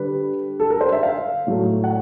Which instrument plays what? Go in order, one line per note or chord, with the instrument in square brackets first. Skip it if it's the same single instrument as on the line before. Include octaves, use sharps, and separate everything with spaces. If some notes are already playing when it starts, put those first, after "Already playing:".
Already playing: [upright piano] D3 G3 B4
A4
A#4
C5
E5
F5
A2 F#3 A3
F#5